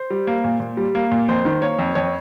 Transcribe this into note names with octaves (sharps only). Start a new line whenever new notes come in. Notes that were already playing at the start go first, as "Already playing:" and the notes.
Already playing: C5
G3
A#3
A#2
A#2
G3
A#3
A#2
F2 C5
D#3
A#3 C#5
F2
F2 C#5